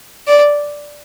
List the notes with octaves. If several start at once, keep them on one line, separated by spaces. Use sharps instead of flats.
D5